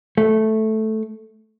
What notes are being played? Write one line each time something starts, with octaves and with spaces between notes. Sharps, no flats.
A3